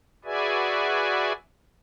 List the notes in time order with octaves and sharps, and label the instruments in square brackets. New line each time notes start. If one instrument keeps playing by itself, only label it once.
[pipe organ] F#4 G#4 B4 D5 E5 G#5